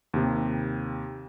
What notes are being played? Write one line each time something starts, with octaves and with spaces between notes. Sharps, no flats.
D#2 C3